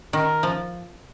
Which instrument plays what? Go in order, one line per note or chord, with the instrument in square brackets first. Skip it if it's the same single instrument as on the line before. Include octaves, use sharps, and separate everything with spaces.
[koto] D#3 [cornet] A#4
[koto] F3